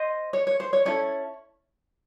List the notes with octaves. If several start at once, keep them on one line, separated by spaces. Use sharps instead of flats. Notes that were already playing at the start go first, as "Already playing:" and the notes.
Already playing: C5 D#5
C#5
C#5
C5
C#5
C#4 E4 A4 C#5